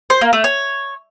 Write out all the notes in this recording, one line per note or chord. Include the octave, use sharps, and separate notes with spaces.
C5
A#3
A3
C#5